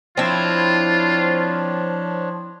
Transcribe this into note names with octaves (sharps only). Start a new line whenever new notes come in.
F3 C4 D4 E4 F4 C#5